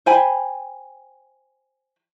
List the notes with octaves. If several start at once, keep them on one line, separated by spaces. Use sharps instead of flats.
C5 G5 G#5 B5